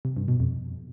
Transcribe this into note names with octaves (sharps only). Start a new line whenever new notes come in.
C3
G2
B2
F2